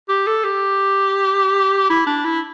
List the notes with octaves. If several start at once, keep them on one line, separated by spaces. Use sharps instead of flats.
G4
A4
G4
E4
D4
E4